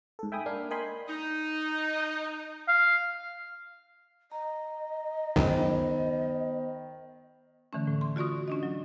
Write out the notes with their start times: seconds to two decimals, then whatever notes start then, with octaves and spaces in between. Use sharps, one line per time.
0.19 G#2 A4
0.32 E5 G5 G#5 B5 D#6
0.46 A#3 D4 F5
0.71 A#4 D#5 G5 G#5 B5 C6
1.08 D#4
2.68 F5
4.32 D#5 A#5
5.36 C#2 F#2 D#3 B3 C5
7.73 D3 E3 A3 C#4
7.87 A2
8.01 C6
8.16 F4 F#4 D5 C#6 D#6
8.48 C#4 D4 D#5
8.63 F#3